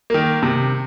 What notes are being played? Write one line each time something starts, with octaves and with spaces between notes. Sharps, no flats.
D#3 A#3
C3